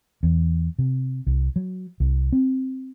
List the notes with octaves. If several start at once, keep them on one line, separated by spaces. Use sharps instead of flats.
E2
C3
C2
F#3
C2
C4